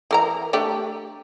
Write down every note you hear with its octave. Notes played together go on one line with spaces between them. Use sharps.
E3 A#4 A#5
A3 D4 G4